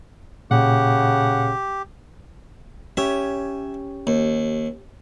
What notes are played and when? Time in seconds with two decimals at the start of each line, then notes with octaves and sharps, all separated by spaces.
0.51 A#2 C#3 G4 F#5
2.97 C#4 G4 C#5 E5
4.07 D#2